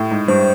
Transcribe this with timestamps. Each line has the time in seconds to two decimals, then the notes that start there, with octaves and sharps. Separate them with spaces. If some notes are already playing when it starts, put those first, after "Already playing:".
Already playing: A2
0.11 G#2
0.28 G2 C5